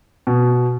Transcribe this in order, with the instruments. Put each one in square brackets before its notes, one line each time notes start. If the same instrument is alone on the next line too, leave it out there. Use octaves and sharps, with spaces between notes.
[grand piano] B2